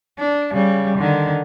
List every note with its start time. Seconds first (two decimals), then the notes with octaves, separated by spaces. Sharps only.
0.19 D4
0.52 C#3 G3
0.98 D3 D#3